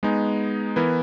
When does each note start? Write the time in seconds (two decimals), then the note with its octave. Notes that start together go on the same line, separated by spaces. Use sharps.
0.03 G#3 B3 D#4 G#4
0.76 E3 B3 E4 A#4